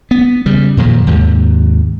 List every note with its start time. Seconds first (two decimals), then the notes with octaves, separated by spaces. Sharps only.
0.11 B3
0.46 C#3 G3
0.77 F2 A#2 D#3 F#3
1.07 D#2 G#2 C3